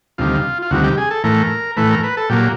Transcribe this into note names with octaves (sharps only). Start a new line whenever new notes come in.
D2 C3 D#3 G3 F4
F4
D2 C3 D#3 G3 F#4
G4
G#4
A4
A2 E3 A3 A#4
A2 E3 A3 B4
A#4
B4
A4
A#2 F#3 A#3 G4